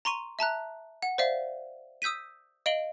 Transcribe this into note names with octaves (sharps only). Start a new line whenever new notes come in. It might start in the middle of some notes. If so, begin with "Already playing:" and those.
A#5 C6 C#6 D#7
E5 A5 A#5 F#6
F#5
C5 D5 E5 F5
D#6 E6 G6 B6 D#7
D#5 F5 D7 F#7 G7